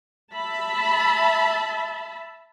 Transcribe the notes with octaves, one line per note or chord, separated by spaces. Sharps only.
E5 A5 B5